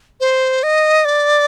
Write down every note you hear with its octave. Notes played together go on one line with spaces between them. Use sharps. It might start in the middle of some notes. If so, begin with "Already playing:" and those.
C5
D#5
D5